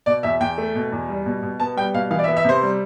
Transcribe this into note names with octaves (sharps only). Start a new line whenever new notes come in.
B2 D5
E2 E5
E2 G5
A3
B2
E2
G3
B2
B2
B3 A5
G3 G5
B2 F5
E3 F5
D5
E5
B3
E5
C3 C5
G3